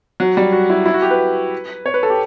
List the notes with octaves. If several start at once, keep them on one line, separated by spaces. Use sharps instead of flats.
F#3
G3
F#4
E4
E4
F#4
G4
B4
C#5
B4
A4
G4